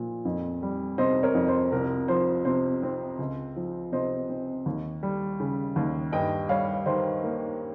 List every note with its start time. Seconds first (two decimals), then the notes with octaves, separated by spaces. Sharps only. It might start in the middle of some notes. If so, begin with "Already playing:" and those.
Already playing: A#2 F3
0.25 F2
0.62 G3
0.98 C3 C5 D#5
1.23 A#4 C#5
1.35 F2
1.48 C5
1.72 C2 A#4
2.08 F3 C5
2.45 C3 C5
2.83 C4
3.19 C#2
3.56 F3
3.92 C3 C5 D#5
4.30 C4
4.66 D#2
5.03 G3
5.40 C#3
5.76 D#2
6.12 G2 D#5 G5
6.49 G3 C#5 F5
6.86 D#3 C5
7.24 A#3